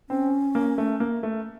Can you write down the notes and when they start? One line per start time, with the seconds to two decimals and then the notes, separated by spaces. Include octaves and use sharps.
0.09 C4 C#4
0.55 A#3
0.78 A3
1.00 A#3
1.23 A3